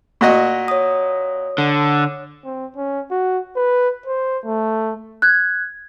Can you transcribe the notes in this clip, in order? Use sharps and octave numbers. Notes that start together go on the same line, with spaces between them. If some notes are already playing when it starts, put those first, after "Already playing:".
A#2 F#4 D#5
C#5 D#6
D3
C4
C#4
F#4
B4
C5
A3
F#6 G#6